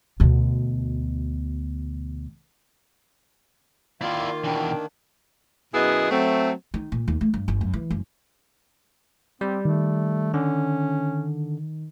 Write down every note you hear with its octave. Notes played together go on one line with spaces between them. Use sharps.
D2 B2
D#3 A#3 E4 F4 D5
B2 E3 D4 G5
F#2 B2 B3 E4 G#4 D#5
F#3 A3 C4
D#3
A#2
D#2
A3
G2
G1
F#2
E3
F#1
G3 C4
D#3 A3
D3 C#4